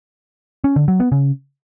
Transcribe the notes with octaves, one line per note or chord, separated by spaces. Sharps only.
C#4
D3
F#3
B3
C#3